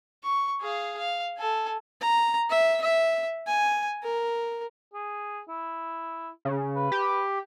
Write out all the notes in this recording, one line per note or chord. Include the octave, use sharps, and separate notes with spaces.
C#6
G#4 F5
F5
A4 G#5
A#5
E5
E5
G#5
A#4
G#4
E4
C#3
B4
G4